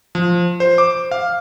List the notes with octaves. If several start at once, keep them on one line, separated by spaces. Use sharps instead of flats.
F3
C5
D6
F5